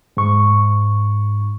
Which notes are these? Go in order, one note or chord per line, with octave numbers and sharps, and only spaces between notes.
G#2 C#6